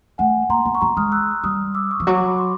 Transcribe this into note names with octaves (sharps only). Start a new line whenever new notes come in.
A3 F#5 G#5
A#3 A#5 C6
B3
C#6
B3 A#5 C6
G#3 D#6 F6
E6 F#6
G3 D#6 F6
D6 E6
C#6 D#6
F3
F#3 C#6
D6
B5 C#6
C6 D6